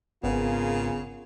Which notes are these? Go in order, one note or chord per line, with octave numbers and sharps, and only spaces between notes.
G#1 C#3 B3 F4 G#4 A#4